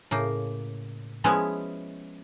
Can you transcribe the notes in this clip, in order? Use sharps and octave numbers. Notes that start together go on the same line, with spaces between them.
A2 C#3 A#3
F3 G#3 B3 C#4 E4 F#4